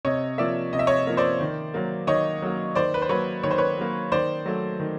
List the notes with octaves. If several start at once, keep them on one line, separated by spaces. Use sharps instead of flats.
C3 C#5 D#5
F3 A#3 D5 E5
C3 D#5
E5
C#5 D#5
F3 A#3
C5 D5
D#3
F#3 A#3
D#3 C#5 D#5
F#3 A#3
D#3 C5 D5
B4
C5
F#3 A#3 B4 C#5
D#3 C#5
C5
B4 C#5
F#3 A#3
D#3 C5 D5
F#3 A3
D#3